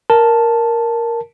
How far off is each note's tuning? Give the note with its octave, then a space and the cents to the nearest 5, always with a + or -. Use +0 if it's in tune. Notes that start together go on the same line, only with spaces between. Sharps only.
A#4 +0 A5 +0